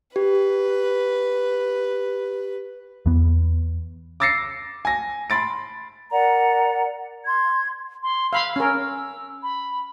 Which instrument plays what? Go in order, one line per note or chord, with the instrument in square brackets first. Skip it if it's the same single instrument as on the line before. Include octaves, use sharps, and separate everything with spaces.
[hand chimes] G4 [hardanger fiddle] B4
[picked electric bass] E2 B3
[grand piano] D6 E6 A6 A#6 C7 C#7
G#5 A#6
B5 C6 A6 D7
[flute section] A#4 D5 F#5 A#5
C6 G#6
[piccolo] C6
[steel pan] F5 B5 C6 [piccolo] E6
[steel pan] C#4 A#4
[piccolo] B5